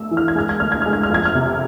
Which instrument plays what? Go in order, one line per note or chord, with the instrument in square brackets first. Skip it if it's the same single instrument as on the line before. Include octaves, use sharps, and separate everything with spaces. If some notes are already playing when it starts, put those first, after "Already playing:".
Already playing: [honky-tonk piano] A3 E6
E3
F6
G#6
G#3 F6
G#6
D2 F6
G#6
G#3 F6
G#6
F6
F2 G#6
F6
C3